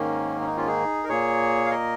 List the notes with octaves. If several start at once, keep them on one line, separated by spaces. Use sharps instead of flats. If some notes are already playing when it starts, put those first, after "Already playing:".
Already playing: G#2 D#3 A#3 C#4
C#4
D#4
C#4 F4
D#4 G#4
A#4
A#2 A#3 G#4 C#5
F5
A#4 D#5